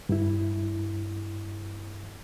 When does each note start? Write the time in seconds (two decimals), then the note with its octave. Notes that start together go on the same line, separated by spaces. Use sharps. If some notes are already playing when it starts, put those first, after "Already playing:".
0.09 G2 E4